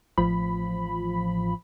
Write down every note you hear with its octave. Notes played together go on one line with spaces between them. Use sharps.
A1 F3 B5